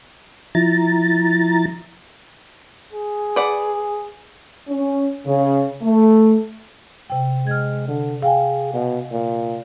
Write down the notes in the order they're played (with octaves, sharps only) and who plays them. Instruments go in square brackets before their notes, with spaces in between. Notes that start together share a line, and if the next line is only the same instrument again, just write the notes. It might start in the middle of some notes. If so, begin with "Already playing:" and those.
[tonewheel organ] F3 E4 A#5 A6
[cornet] G#4
[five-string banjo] B4 D5 F#5
[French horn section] C#4
C#3
A3
[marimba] C3 G5
[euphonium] G#3 [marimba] F6 G#6
[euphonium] D3
[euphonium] G#4 [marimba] F5 G5 G#5
[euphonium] B2
A#2